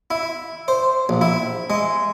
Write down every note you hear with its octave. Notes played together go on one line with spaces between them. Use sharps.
E4
C5
A#1
E4
G#3